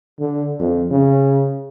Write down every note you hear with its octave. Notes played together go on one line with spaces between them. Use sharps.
D3
F2
C#3